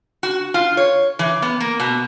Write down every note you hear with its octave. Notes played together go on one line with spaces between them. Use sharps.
F#4
F4
C#5
E3
B3
A#3
B2